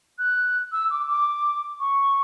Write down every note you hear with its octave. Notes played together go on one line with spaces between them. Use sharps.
F#6
E6
D6
D6
C#6